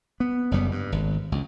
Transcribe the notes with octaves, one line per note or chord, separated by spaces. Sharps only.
B3
F#1 F#2 G3 B3
G2
G#1
C#2